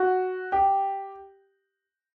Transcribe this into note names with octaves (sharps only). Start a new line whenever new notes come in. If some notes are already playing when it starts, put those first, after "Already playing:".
Already playing: F#4
G4